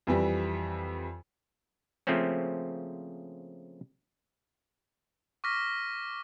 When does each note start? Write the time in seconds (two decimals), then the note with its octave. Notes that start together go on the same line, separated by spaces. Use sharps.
0.07 F2 E3 G3
2.07 C#3 F3 A3 A#3 C4 C#4
5.44 C#6 D6 F6 A#6 B6